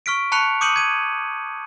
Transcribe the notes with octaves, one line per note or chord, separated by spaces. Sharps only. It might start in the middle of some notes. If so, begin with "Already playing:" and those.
C#6 F6 B6 D7
A5 B5 C#6 F#6 C#7 F7
D6 D#6 G6 C#7 D#7 F#7
G#6 D#7